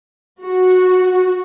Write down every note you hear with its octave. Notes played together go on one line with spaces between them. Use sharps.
F#4